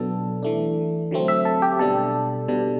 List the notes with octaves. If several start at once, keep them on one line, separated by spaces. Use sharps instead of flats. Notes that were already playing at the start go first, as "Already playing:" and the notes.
Already playing: B2 F#3 B3 D4 A4
E3 A3 D4
D3 F#3 A3 C4
E5
A4
G4
B2 G3 D4 A4
B2 G3 D4